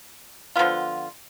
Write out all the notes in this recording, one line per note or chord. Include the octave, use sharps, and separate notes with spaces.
D3 F3 B3 F4